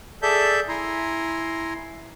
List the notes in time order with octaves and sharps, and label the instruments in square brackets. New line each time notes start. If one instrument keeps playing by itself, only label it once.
[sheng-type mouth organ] G#4 A4 D5 E5 A5 G6
E4 G#5 A#5 C6